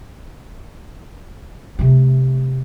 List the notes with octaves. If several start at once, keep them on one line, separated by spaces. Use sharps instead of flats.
C3 A3